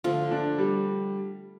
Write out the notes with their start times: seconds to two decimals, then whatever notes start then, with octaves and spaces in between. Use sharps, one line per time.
0.04 D3 F3 A3 F4
0.31 D4
0.58 G3